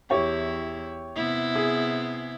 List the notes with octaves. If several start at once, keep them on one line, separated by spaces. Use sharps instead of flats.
E2 E4 G4 C#5 G5
C3 B3 E4
G#4